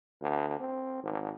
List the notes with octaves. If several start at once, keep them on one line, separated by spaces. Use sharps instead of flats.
D2
C4
G#1